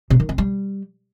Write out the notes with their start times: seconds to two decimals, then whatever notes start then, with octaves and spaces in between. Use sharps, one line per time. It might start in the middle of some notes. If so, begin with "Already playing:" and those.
0.10 C3
0.20 D#3
0.29 C4
0.38 G3